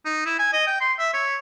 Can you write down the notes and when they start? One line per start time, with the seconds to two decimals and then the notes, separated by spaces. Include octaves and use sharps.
0.05 D#4
0.26 E4
0.39 G#5
0.53 D#5
0.67 G5
0.81 C6
0.99 E5
1.14 C#5